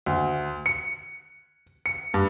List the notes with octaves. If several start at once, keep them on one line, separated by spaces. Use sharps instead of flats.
D2
C#7
C#7
G2